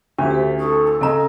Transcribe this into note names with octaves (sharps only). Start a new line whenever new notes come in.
D2 C#4 G4 C5 E5
G4 A4
D#4 A4 C#6 D#6
E6
C#3 A4 D#5 A#5